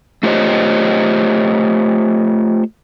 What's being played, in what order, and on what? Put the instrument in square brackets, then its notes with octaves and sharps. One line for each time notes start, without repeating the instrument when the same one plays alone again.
[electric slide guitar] A3 F4 G4 C5 C#5 D#5